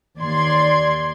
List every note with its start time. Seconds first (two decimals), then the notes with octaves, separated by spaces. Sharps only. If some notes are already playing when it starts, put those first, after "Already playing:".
0.18 D#2 D5 C6 G#6